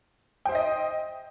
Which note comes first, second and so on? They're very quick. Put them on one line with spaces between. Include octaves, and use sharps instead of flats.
G5 C5 E5 D#5